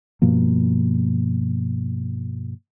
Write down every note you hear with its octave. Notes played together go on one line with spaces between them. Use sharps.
G2 B2 F3 A#3